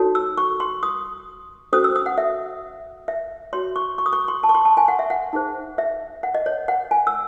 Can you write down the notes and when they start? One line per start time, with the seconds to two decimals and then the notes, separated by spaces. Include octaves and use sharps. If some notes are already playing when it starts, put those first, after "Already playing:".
Already playing: D#4 F#4 A4 C#5
0.15 E6
0.37 C#6
0.60 C6
0.83 D#6
1.73 C#4 F#4 A4 C5 D#6
1.84 E6
1.96 D#6
2.06 F#5
2.18 E5
3.08 E5
3.53 F#4 C#5 C6
3.76 C#6
3.98 C#6
4.06 D#6
4.13 C#6
4.28 C6
4.43 A5
4.49 C#6
4.54 C6
4.65 A5
4.77 G#5
4.88 F#5
4.99 E5
5.10 F#5
5.33 D#4 G#4 C5
5.78 E5
6.23 F#5
6.34 D#5
6.46 C#5
6.68 F#5
6.91 G#5
7.07 E6